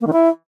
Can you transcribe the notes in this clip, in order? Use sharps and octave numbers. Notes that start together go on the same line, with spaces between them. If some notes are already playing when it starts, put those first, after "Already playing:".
A#3
D#3
E4